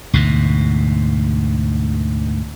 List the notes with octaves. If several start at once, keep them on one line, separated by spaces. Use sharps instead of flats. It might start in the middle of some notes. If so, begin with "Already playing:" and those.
D2 G#2 B2